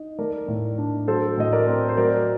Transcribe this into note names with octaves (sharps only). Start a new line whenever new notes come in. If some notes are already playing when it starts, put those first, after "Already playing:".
Already playing: D#4
A3 A#4 D5
A2
D4
F#3 A4 C5
A2 D#5
A#4 D5
C4
C5
F#3 A#4 D5